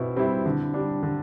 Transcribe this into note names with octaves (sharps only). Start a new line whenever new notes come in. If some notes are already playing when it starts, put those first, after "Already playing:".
Already playing: B2 C4 E4
G3 C4 E4
D3
G3 D4
D3